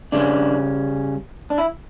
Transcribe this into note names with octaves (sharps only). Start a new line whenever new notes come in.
C#3 G3 C#4 D4
D4
E4